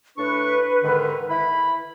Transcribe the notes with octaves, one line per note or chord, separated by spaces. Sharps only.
A2 D4 B4 C#6
G#2 D3 D#3
E4 B5